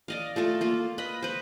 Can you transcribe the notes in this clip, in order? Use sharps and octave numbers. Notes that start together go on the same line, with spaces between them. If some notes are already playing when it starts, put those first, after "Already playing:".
D5 D#5 F5
A3 F4 A4
A#3 F4
B4 D#5 B5
B4 C5